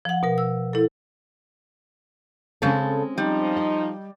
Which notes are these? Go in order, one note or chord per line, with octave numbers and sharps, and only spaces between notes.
F3 F#5
B2 A#4
E6
E4 A4
C#3 G#3 C4 C#4 A4
F3 G3 D#4
D#5